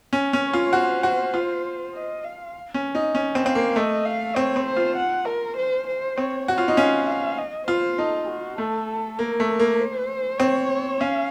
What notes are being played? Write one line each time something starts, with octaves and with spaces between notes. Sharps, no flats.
C#4
C#4
C#5
F4
F#4 C5
F#4
F4
D#5
F5
C#4
D#4
C#4
C4
C4 F5
A#3
A3 D#5
F5
C4 C#5
C4
C5
F4
F#5
A#4
C5
C5
C4 C#5
F#4 C#5
F4
D#4
C#4 F5
F5
D#5
F4 C5
D#4 A4
F#4
A3 A4
A#3 A#4
A3
A#4
A#3
C5
C4 C#5
C#4 F5